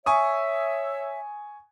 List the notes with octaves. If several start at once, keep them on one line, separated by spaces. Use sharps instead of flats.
C#5 E5 G#5 C#6 D#6